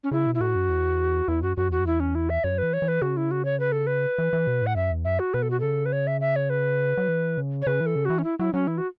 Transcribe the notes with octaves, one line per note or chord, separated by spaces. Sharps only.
C#4
C#3 E4
B2
E4
A2 F#4
F#2
E2
E2 E4
F#2 F#4
F#2 F#4
E2 F#4
F#2
E2 E4
C#4
E4
E5
F#2 C#5
E3 B4
C#5
E3
B4
C#3 F#4
E4
F#4
C#5
B4
A4
B4
E3
E3
B2
A2 F#5
F#2 E5
E2
F#2 E5
F#4
B2 B4
A4
F#4
C#3 A4
B4
C#5
E5
E5
C#5
B4
F#3
E3
C#3
C#5
C#3 B4
E3
A4
C#3
E3 F#4
C#4
E4
F#3 E4
F#3 C#4
E3 E4
F#4